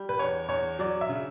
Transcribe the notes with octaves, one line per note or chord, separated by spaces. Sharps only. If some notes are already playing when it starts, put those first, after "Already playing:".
Already playing: G3
B4
E2 C#5
E2 C#5
F#3 D5
E5
C#3